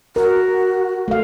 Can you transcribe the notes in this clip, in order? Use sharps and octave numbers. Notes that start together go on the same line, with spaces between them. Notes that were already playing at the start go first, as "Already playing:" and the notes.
F#4 A#4
A3 F5